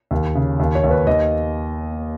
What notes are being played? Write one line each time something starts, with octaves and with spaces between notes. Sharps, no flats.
D#2
C#3
D#2
C#5
D#2
B4
D#2 D#5